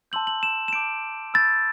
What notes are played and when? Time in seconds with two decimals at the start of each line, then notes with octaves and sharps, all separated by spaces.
0.12 A5 C6 E6 G6 F#7
0.27 F#7
0.43 E7
0.68 E7
0.73 A5 D6 G6 D7
1.34 B5 E6 G6 A6